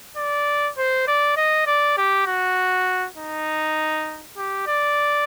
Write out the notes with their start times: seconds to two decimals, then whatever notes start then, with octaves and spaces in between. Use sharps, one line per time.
0.17 D5
0.78 C5
1.07 D5
1.37 D#5
1.66 D5
1.98 G4
2.27 F#4
3.17 D#4
4.37 G4
4.67 D5